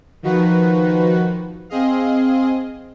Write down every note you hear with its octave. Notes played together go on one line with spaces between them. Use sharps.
D#3 F3 D#4 F#4 B4
C4 G#4 D#5 F5